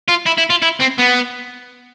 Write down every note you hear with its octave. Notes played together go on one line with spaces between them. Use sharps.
F4
E4
E4
F4
E4
C4
B3